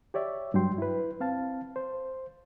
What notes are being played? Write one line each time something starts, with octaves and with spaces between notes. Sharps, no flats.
G4 C#5 D5 E5
G2 F#3 G3 G5 C6
E4 B4
C4 F5 A5
C5